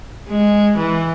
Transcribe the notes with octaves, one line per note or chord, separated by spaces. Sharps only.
G#3
E3